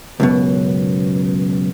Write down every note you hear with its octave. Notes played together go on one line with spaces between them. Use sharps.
C#2 F#2 B2